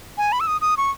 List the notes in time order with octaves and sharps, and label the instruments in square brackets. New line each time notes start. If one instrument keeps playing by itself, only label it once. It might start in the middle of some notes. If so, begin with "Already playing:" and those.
[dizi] G#5
B5
E6
D#6
D#6
C#6